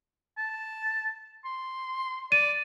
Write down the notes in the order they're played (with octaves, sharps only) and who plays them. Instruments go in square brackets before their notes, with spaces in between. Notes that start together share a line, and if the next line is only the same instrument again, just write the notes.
[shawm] A5
C6
[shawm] D5 [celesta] D#7